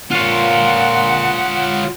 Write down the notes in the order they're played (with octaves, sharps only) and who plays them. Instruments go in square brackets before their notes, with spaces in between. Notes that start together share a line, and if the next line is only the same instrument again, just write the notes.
[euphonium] A#2 [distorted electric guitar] F4 C#5 [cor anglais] F#5